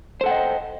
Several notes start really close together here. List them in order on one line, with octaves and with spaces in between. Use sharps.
C5 A4 F#5 G5 D#5